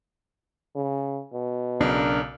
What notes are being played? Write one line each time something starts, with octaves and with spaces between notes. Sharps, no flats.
C#3
B2
B1 C#3 D4 A#4